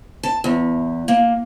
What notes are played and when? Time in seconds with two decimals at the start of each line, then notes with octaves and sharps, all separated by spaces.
0.23 A5
0.44 E2
1.08 A#3